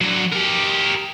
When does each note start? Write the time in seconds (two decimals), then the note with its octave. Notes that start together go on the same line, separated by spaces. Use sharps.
0.01 D3 F#3
0.33 G4 A#4